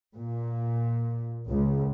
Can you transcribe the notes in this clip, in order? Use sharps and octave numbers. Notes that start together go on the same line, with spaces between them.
A#2
C#2